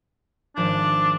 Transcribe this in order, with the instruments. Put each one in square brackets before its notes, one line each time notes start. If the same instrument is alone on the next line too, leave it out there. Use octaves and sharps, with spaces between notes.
[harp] G#1 F3 G6 [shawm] D4